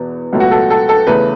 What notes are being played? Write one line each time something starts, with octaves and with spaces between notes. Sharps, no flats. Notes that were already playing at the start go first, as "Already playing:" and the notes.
Already playing: E2 B2 B3
C#2 B2 F#3 A3
F#4
A4
A4
A4
E2 C#3 A3 B4